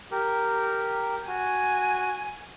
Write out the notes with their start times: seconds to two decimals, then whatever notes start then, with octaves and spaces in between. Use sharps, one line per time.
0.12 G4 A#4
1.28 F#4 G#5